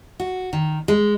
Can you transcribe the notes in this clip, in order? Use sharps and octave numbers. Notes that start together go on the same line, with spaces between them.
F#4
D#3
G#3